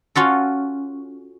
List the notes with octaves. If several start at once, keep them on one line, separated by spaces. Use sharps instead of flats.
C#4 F4 F#4 A4